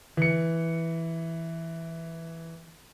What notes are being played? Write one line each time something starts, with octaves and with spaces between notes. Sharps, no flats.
E3 C#7